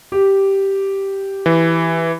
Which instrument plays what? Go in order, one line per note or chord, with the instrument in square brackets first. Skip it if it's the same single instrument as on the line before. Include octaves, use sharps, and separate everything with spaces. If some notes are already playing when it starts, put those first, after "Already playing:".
[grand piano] G4
[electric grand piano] E3